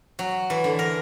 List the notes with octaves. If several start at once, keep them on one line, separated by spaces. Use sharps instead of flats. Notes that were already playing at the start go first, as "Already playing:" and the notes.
F#3
E3
D3
A#4